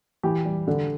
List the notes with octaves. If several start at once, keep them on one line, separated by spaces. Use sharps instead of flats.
E3 G4
G3
D3